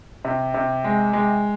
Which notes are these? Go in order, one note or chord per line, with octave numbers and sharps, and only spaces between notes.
C3
C3
G#3
G#3